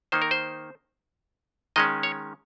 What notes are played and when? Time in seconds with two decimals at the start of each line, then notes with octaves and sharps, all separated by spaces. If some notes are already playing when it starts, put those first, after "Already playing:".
0.12 D#3 A#3 D#4 C5
0.22 A#4
0.31 C5
1.76 D#3 G#3 C#4 D#5
2.03 C#5